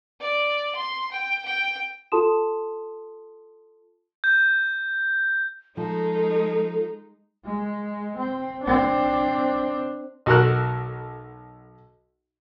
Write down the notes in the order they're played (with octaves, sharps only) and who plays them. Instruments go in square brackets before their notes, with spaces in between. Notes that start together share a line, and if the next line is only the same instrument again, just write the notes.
[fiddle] D5
C6
G5
G5
[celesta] F4 A4 A5 C6 D#6 E7
[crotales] G6
[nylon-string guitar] F3 [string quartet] G#3 D#4 [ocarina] A4
[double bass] G#3
C4
C4 D4
[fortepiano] B1 F#4 A4 A#4 F#6